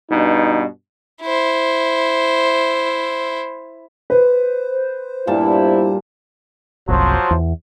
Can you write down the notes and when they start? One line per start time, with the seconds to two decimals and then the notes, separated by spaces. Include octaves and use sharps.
0.11 G2 B2 D#4
1.22 E4 C5
4.10 B4 C5
5.27 G2 A#2 B3 D4 E4 A5
6.88 F#1 C2 F3 F#3 C5
7.31 E2